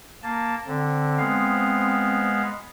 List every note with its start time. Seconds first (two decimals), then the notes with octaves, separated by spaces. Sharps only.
0.23 A#3 A5
0.67 D3 C4
1.18 G#3 B3 F5